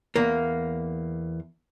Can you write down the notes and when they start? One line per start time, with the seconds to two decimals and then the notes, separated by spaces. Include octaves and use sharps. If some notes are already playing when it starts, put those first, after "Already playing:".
0.16 E2 A#3